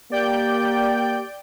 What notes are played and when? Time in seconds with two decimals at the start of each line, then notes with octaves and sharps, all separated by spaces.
0.12 A#3 G4 D5 G5 G6